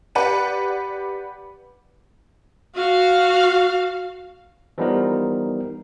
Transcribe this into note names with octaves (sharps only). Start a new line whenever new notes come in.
G4 B4 D5 F#5 D#7
F#4 F5
E3 F3 G3 B3 D#4 A#4